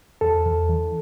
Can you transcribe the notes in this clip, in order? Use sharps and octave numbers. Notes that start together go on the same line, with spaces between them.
E2 A4
E2
E3